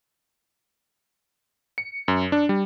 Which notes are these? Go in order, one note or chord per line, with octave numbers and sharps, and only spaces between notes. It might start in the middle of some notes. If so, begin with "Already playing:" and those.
C#7
F#2
D4
G3